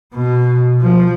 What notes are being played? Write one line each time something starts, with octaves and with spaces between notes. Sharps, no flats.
B2
F3